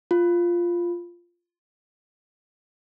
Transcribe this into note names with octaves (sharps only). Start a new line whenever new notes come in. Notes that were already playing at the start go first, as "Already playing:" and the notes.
F4